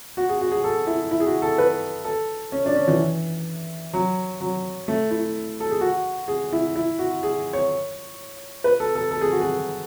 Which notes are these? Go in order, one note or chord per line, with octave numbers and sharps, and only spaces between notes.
F#4
G#4
F#4
G#4
A4
E4
E4
G#4
F#4
A4
B4
A4
C#4
D4
C#4
E3
F#3
F#3
A3
E4
A4
G#4
F#4
G#4
E4
E4
F#4
G#4
C#5
B4
A4
A4
A4
G#4
F#4
G#4